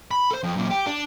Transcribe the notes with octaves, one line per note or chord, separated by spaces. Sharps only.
B5
A4 C5
F2
F#2 A#2
G4
D4